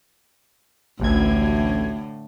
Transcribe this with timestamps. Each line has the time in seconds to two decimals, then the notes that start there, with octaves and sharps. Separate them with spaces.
1.00 A1 D2 A2 D3 G#6